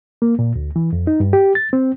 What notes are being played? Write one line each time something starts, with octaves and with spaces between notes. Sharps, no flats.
A#3
A#2
D2
E3
F2
D#4
G2
G4
A6
C4